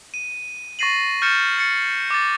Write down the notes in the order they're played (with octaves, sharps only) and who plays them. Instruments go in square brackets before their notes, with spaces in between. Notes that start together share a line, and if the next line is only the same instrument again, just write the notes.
[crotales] D#7
C#6 A6 A#6 C7 D#7 F#7
C#6 F6 G6 A6 C#7 E7
A6 C#7
D6 A6